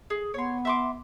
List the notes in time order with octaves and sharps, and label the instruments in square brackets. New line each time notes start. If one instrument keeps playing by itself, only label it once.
[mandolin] G#4
[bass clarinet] B3 [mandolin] C#5 C6
[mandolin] E5 C6 D6